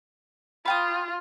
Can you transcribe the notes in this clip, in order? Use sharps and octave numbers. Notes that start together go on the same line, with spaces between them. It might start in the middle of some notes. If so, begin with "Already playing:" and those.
F4 B4 G5 D#6